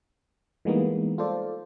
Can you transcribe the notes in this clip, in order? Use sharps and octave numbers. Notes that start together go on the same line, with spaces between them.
E3 G3 G#3 A#3 B3 D#4
F4 A4 C5 D5